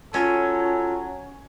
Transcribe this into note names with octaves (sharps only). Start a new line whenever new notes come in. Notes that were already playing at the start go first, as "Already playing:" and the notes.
F#3 C#4 F4 A4